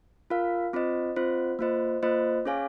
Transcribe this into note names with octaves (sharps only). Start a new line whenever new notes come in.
F4 A#4 F5
C4 F4 C5 D#5
C4 F4 C5 D#5
A#3 F4 C5 D#5
A#3 F4 C5 D#5
C#4 G#4 C#5 F5 G#5